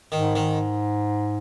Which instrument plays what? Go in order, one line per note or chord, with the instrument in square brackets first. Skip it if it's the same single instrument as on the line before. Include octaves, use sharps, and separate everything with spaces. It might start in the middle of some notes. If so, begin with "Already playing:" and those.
[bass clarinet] G#2 [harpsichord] D#3
[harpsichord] D#3